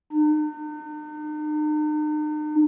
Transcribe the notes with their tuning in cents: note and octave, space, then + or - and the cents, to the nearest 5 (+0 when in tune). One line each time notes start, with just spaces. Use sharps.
D#4 -45